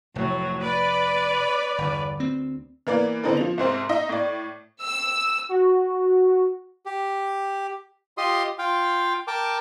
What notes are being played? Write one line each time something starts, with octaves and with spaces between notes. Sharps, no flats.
F1 A2 F#3
B4 D5 B5
G1 E2
D2 C4
E3 A#3 B3 D5
D3 B3 C4 D#4 E4 A4
F3 F7
C2 G#2 C4
D#4 D#5 E5
A2 D5
E6
F#4
G4
F4 G4 D#5 C6 D#6
F4 F5 G5
A#4 G5 A5 D6